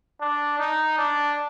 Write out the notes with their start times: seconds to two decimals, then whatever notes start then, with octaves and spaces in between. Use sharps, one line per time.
0.21 D4
0.59 D#4
0.98 D4